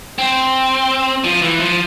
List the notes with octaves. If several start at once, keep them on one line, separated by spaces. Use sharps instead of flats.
C4
F3
E3
F3